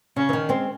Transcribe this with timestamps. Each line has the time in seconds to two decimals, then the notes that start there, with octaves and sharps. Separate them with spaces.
0.16 C#3 C#4
0.29 E3
0.33 D#3
0.49 G#3 C4